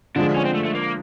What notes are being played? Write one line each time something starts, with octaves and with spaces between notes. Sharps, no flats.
D3 F3 G#3 D4
C#4
C4
A3
A3
A#3